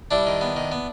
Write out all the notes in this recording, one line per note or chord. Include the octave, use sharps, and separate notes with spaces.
G3 D4 E4
D#3
B3
D#3
B3